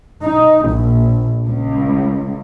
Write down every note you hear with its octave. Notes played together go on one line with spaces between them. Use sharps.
D#4
A#1
C#2